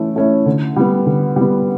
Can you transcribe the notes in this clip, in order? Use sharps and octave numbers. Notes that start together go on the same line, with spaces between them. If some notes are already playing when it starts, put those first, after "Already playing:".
Already playing: E3 A3 C#4 E4
A3 C#4 E4
D3
G3 B3
D3
G3 B3